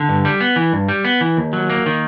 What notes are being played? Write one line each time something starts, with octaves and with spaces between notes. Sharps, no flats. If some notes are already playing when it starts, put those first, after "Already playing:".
Already playing: D3
G2
G3
B3
E3
G2
G3
B3
E3
D#2
F#3
A#3
D#3